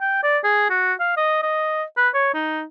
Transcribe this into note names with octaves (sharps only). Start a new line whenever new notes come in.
G5
D5
G#4
F#4
F5
D#5
D#5
B4
C#5
D#4